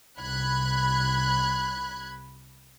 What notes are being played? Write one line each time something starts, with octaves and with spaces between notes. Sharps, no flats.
C2 B5 F#6 G#6